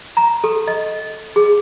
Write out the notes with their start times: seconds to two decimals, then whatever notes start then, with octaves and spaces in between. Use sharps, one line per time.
0.17 A#5
0.44 A4
0.68 D#5
1.36 G#4